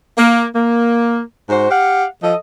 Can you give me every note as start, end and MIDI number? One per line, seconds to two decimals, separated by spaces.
0.17 0.46 58
0.54 1.19 58
1.49 1.65 44
1.49 1.65 66
1.49 1.65 72
1.71 2.04 67
1.71 2.04 77
1.71 2.04 78
2.23 2.35 53
2.23 2.35 69
2.23 2.35 75